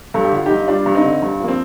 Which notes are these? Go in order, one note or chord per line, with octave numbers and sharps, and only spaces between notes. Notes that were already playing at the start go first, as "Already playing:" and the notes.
G2 A4
G4
D3 F4
G2 D#4 G4
G3 D4 F4
G2
C4 D#4
D3
G2
F3 A#3
C4